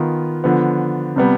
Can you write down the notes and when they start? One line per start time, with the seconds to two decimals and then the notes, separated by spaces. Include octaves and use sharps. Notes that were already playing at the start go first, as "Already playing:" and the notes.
Already playing: D#3 B3 F4
0.44 D3 F3 B3
1.16 C3 G3 B3